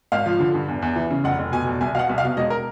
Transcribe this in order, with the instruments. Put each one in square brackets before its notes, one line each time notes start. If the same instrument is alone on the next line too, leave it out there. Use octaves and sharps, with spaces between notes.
[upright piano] G#1 F5
F3
D3
G2
E2
E2
E3
C#3
F1 F#5
F1
B2 G#5
E2
C2 G#5
B2 F5
F#5
C2
F5
B2
E1 D#5
A#4